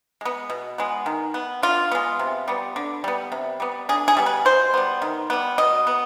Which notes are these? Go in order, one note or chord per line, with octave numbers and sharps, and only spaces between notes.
G#3 B3
B2
G#3 B3
D#3
B3
D3 F4
G#3 B3
C3
G3 B3
D3
G3 B3
C3
G3 B3
D3 G#4
G#4
G3 B3
B4
B2 C5
G3 B3
D#3
G3 B3
B2 D#5
B3